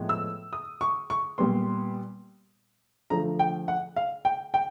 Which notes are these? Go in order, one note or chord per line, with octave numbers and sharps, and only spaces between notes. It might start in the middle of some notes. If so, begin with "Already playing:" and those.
Already playing: A2 F3 G#3 B3
E6
D#6
C#6
C#6
A#2 G3 B3 C6
D3 F3 A3 A#5
G5
F#5
F5
G5
G5